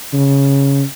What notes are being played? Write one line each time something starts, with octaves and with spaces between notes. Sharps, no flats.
C#3